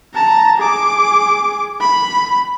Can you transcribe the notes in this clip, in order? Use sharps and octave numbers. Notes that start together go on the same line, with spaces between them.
A5 A#5
G#4 D6
B5